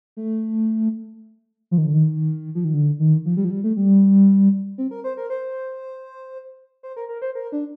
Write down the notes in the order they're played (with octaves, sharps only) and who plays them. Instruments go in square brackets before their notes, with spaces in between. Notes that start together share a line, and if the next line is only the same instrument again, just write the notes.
[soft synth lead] A3
F3
D#3
D3
D#3
F3
D#3
D3
D#3
F3
G3
F3
G3
A3
G3
C4
A#4
C5
A#4
C5
C5
A#4
A#4
C5
A#4
D4